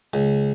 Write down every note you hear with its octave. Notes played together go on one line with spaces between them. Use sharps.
C#2